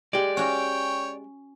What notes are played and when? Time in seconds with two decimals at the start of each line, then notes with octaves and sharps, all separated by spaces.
0.13 G#3 G4 D5
0.37 C#4 F#4 C#5 G5